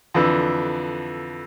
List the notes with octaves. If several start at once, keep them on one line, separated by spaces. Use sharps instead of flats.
F2 D3 E3